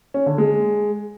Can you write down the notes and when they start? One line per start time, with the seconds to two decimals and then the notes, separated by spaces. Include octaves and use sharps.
0.14 C#4
0.26 D3
0.38 G#3